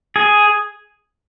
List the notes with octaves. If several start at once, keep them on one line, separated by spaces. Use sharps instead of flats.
G#4